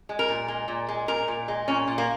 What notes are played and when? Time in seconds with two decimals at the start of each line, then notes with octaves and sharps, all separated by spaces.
0.09 G#3
0.19 A#4
0.28 A#2
0.48 G#3
0.68 A#2
0.88 G#3
1.08 A#2 A#4
1.28 A#2
1.48 G#3
1.68 A#2 C#4
1.87 A#2
1.98 A#3